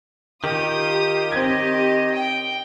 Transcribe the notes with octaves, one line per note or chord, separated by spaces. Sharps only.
D#3 F4 G4 D#6
C4 D#5 G#6
G5